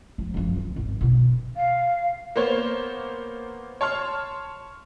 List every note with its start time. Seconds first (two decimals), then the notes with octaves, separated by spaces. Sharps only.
0.18 F3
0.34 F#1 F3
0.56 D2
0.76 G#1
1.01 B2 D3
1.56 F5
2.36 A#3 B3 C5 C#5
3.81 C#5 A5 C6 F6